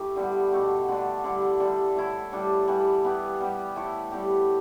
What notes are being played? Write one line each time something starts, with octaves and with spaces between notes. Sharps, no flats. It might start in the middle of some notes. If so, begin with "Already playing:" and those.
Already playing: A3 E4 G4
D3 G3 B3
B2 A3 G4
D3 A3 D4
D3 G3 E4 A4
D3 G3 D4 A4
A2 A3 E4 A4
A2 G3 D4 A4
E3 G3 B3 E4
E3 B3 E4 G4
G3 B3 G4
A2 A3 E4 A4
A2 G3 B3 G4